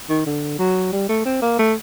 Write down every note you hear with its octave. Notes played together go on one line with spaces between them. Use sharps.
D#3
D3
F#3
G3
A3
C4
A#3
A3